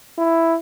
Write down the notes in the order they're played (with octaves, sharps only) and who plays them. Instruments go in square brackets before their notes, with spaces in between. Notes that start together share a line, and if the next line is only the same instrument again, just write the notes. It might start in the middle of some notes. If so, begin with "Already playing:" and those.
[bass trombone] E4